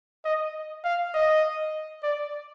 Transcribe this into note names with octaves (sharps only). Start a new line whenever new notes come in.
D#5
F5
D#5
D5